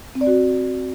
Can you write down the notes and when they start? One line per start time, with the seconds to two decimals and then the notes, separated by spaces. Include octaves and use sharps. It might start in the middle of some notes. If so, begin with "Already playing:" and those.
0.15 C4
0.21 D5
0.27 F#4